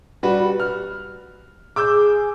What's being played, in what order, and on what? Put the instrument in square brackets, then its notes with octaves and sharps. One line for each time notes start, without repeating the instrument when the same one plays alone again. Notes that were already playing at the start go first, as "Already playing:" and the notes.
[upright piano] G3 F#4 B4
F6
[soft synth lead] G#4 [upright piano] D6 E6 G6